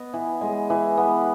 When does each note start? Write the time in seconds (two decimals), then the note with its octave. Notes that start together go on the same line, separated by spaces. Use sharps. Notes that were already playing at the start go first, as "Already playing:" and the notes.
Already playing: B3 D#5
0.13 E3
0.41 G#3
0.70 E3
0.97 B3